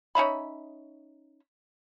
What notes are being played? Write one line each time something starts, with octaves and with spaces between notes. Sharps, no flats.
C#4 D#4 E5 B5